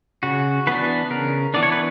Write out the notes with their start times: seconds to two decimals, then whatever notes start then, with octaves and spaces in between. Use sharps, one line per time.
0.23 C#3 F#4
0.67 E3 B3 D4 B4
1.10 C#3 A#4
1.54 E3 B3 D4 D5
1.63 C#5
1.72 B4